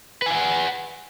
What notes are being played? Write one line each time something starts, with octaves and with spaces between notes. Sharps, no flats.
B4 F5 F#5 G#5